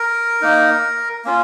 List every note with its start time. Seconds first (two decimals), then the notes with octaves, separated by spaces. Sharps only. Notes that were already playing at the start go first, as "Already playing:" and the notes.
Already playing: A#4
0.41 A#3 D#4
1.25 A#3 C#4 F4